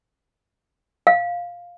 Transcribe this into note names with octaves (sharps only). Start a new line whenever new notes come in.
F5